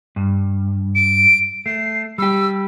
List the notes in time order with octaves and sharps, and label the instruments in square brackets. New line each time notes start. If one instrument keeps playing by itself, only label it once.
[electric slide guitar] G2
[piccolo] D7
[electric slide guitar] A3 [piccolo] C7
[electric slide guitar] G3 G4 [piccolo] E6